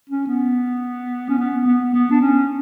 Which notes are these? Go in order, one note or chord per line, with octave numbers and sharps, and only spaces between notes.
C#4
B3
C#4
B3
B3
B3
D4
C#4